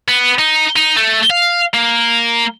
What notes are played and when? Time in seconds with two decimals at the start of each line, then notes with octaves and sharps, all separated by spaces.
0.08 B3
0.39 D#4
0.76 D#4
0.97 A3
1.31 F5
1.74 A#3